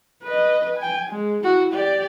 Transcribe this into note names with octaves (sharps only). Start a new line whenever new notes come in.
B4 D#5
G5 G#5
G#3
E4 F#4
G4 D5